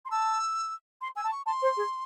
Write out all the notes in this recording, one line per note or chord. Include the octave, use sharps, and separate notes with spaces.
C6
A5 E6
C6
G#5 E6
A5
C#6
A5 C6
C5
G#4